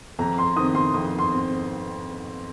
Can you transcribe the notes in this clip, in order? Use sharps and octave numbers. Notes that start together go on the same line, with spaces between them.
F2 A#5
C6
D#3 C4 D#6
C6
F2 D#6
C6
C4